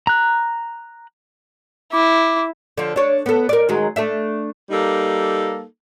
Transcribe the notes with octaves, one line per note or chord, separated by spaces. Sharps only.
A#5 F#6
E4 D6
D3 F3
D4 C#5
B3 A4
A#4 D5
D#3 F#3 G#3
A3 D4 E5
G3 A#3 D#4 A4